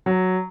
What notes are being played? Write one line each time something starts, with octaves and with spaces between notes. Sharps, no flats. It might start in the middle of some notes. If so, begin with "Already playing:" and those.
F#3